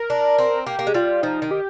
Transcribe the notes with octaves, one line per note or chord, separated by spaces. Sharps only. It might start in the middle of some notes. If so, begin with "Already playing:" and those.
Already playing: A#4
D4
C4
A#3 G4
A#3
G#3
G3 F4
F3 D#4
D#3
G4